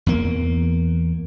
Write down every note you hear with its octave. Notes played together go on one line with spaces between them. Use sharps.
E2 A#3